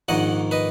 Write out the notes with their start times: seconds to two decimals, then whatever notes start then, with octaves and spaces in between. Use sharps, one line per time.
0.08 A#1 G#2 D#3 D#5 F#5
0.51 B4 D#5